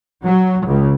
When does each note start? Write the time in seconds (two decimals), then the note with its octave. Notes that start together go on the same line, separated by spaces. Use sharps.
0.25 F#3
0.66 C#2